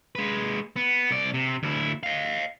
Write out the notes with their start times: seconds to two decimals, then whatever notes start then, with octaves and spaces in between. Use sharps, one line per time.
0.15 G#3 B4
0.76 B3
1.11 C2 D5
1.34 C3
1.63 D2 E4
2.03 D#5 F5